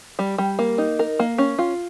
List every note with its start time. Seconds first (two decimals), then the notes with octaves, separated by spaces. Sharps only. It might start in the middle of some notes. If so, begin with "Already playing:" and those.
0.19 G3
0.38 G3
0.59 A#3
0.78 D#4
0.99 A#4
1.20 A#3
1.38 C#4
1.59 F4